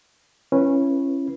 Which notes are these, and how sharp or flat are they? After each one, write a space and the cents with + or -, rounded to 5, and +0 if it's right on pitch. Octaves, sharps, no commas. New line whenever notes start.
C#4 -15 E4 +35 B4 -15